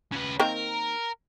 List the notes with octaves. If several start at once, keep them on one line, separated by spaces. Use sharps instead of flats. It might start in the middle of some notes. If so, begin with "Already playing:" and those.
C#3 B4
D#3 A#3 C4 A#4